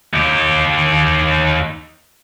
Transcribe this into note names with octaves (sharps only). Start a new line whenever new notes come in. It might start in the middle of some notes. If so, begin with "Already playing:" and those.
D#2 G4